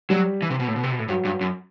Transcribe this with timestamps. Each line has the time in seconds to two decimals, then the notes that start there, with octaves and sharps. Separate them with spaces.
0.10 F#3 G3
0.42 E3
0.50 C3
0.60 B2
0.68 A2
0.76 B2
0.83 C3
0.92 B2
0.99 A2
1.08 G2 F#3
1.25 G2
1.41 F#2